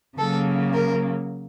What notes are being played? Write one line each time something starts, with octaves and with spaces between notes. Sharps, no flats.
C#3 F#3 A#3 A4
A#4